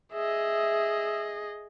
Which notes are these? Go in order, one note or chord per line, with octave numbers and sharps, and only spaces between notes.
G#4 D#5 E5